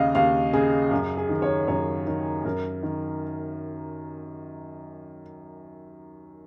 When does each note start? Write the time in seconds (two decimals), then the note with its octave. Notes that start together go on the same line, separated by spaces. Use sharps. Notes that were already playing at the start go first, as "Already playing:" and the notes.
Already playing: D#2 C#3 D#5 F5
0.15 D#2 F5
0.53 C#3 G#4
0.91 F#2 G#4
1.17 G#4
1.29 D#3
1.42 C#5
1.68 F#2 C#5
2.07 D#3
2.44 F#2 A#4
2.83 D#3